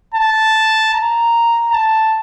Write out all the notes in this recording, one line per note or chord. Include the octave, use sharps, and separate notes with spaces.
A5
A#5
A5